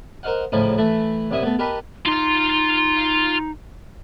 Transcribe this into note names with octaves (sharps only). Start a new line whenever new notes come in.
A#4 C5 D#5 F5 F#5
A2 C#3 F3 D#4 E4
E3 A3 E4
C2 F#2 E4 E5 D#6
A3 B3
G4 A#4 B4 D#5 A5 B5
D#4 F4 C6